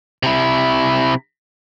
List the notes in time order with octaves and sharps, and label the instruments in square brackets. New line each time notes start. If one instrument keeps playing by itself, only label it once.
[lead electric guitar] C3 E4